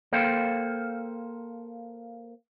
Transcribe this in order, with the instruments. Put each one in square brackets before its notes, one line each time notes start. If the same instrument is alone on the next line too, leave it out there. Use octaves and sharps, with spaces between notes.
[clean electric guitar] A#3 A4 C5 F5 G5